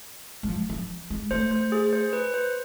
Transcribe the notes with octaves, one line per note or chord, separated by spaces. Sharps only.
G#3
F3
F3
G#3
A3 C5
C5
G#4
C5
B4
C5